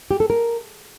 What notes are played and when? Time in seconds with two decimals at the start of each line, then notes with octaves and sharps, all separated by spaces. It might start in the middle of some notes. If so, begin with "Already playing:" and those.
0.11 G4
0.20 A4
0.30 A#4